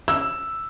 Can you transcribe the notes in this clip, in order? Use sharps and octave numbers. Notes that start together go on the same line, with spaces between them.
E6